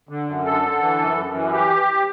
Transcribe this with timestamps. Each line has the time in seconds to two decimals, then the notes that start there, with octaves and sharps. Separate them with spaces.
0.09 D3
0.27 F#2
0.45 D3 A4
0.63 D3
0.81 E3
0.99 F#2
1.17 F#2
1.35 E3
1.53 G4